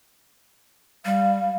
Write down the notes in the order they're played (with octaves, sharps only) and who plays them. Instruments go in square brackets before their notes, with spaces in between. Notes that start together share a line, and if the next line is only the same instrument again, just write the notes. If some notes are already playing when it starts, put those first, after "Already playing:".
[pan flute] G3 [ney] F5